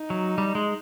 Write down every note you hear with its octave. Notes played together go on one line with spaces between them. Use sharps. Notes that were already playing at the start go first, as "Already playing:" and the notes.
Already playing: D#4
F#3
G3
G#3